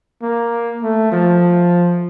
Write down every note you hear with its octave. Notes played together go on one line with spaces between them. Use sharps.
A#3
A3
F3